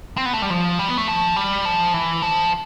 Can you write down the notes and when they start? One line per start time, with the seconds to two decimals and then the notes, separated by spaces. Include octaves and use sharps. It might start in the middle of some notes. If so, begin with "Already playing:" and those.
0.17 C4
0.25 B3
0.33 A3
0.42 G3
0.50 F3
0.79 G3
0.88 B3
0.98 A3
1.08 F3
1.36 G3
1.65 F3
1.94 E3
2.22 F3